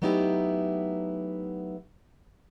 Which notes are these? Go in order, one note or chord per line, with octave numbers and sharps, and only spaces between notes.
F#3 A3 B3 D#4 E4 G4